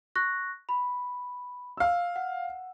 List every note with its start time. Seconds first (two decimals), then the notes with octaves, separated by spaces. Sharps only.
0.16 C#6 F#6 A#6
0.69 B5
1.77 F5 E6
2.16 F#5